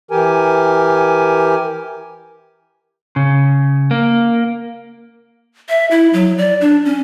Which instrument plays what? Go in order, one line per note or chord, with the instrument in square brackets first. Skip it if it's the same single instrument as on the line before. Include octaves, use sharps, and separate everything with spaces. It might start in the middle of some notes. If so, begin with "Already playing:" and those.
[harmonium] E3 G4 A#4 G#5
[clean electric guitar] C#3
A#3
[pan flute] E5
E4
F#3
D5
D4
C#4